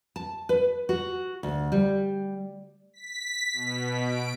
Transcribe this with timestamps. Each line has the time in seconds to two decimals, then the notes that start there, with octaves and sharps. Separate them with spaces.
0.16 A5
0.49 B4
0.89 F#4
1.43 D2
1.72 G3
2.93 B6
3.53 B2
4.03 D7